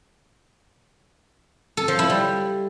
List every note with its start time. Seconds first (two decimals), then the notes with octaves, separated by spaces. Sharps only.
1.77 A4
1.88 F3
1.99 E4
2.10 G3